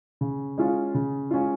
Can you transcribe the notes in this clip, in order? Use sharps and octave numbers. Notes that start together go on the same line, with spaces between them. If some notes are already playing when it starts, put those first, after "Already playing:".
C#3
G#3 C#4 F4
C#3
G#3 C#4 F4